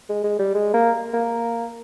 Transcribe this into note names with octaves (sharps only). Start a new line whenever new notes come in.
G#3
G#3
G3
G#3
A#3
A#3